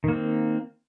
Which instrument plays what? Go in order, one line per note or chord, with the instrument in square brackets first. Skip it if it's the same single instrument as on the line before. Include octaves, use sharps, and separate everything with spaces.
[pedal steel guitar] D#3
A#3
C4